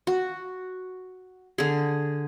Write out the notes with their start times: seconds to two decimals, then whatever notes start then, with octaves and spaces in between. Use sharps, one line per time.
0.07 F#4
1.58 D3 G#4